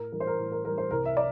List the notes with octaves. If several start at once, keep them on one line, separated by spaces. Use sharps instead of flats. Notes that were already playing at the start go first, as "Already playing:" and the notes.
Already playing: A2 A#4
E3 G3 A#4
C5
A#4
A2
A#4
E3 G3 A#4
C5
C2 A#4
E5
D5